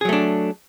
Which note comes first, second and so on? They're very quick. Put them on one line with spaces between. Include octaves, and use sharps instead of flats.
G#4 F#3 A3 D4